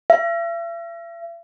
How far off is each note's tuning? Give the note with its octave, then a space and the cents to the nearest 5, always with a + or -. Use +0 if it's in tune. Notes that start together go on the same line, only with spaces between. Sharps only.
E5 +45